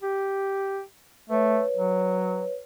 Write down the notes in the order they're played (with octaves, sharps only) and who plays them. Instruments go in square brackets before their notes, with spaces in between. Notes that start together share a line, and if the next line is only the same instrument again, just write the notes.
[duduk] G4
[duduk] A3 [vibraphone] B4 C#5
[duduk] F#3